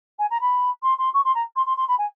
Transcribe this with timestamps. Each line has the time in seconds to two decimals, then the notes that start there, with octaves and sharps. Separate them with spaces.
0.19 G#5
0.30 A#5
0.40 B5
0.82 C6
0.98 C6
1.14 C#6
1.24 C6
1.34 A#5
1.56 C6
1.66 C6
1.77 C6
1.87 B5
1.98 G#5